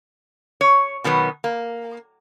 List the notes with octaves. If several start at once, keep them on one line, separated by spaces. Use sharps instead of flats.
C#5
B2 D#3 F#3 B3
A#3